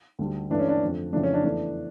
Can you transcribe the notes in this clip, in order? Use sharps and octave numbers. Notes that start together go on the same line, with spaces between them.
D2 D3 G3
G2 E3 A3 D4
C#4
D4
F2 D3 A3
F2 C#3 E3 A3 D4
C#4
D4
E2 E3 A3 D4